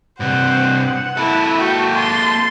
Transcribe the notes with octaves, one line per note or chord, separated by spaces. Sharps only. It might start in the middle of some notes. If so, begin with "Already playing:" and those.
G2 C3 C5 F#5
A#3 E4 A4
F#4 G5
A5 C6